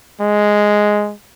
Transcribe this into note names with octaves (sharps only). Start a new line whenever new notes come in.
G#3